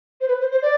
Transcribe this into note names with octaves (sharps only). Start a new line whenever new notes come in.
C5
B4
C5
C5
D5